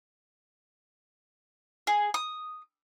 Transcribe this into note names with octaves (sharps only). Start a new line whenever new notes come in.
G#4
D#6